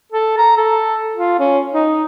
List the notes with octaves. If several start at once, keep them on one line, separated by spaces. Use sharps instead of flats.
A4
A#5
A4
F4
C#4
D#4